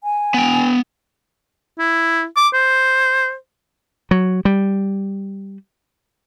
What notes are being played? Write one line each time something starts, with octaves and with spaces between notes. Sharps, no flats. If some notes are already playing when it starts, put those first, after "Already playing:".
G#5
B3 G5
E4
D6
C5
F#3
G3